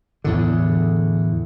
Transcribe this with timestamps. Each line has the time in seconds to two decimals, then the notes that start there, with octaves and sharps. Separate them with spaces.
0.24 E2 A2 D3